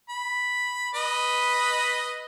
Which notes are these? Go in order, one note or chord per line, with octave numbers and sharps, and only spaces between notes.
B5
B4 D#5 B5